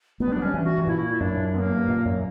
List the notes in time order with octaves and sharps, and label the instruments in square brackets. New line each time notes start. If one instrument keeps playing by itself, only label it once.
[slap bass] A#3 [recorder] B3
[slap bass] G3
[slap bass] F#3 [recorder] D4
[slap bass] G3 [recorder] C#4
[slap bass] E3
[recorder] F#4
[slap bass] G2
[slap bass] A#2 [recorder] E4
[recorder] E4
[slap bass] F#2 [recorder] D4
[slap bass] F#2 [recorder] B3
[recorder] A#3
[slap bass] G2
A#2
F#2